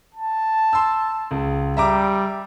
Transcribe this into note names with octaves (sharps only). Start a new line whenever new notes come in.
A5
C6 E6
C#2
G3 E5 A#5 D6